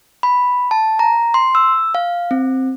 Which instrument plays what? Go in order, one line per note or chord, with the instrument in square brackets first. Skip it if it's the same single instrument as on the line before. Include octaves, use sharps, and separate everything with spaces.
[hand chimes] B5
A5
A#5
C6
E6
F5
C4